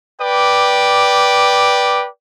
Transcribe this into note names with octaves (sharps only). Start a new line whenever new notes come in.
B4 D5 G5 D6